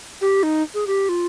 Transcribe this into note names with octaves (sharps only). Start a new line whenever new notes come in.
G4
D#4
G#4
G4
F4